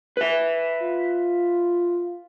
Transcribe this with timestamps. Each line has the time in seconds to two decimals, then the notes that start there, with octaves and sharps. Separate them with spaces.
0.17 B4 E5
0.82 F4